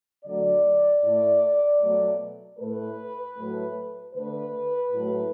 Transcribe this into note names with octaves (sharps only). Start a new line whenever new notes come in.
D3 F#3 A3 D5
A2 A3
B2 F#3 A3
A2 A3 B4
A2 F#3 A3
D3 A3 B4
A2 F#3 A3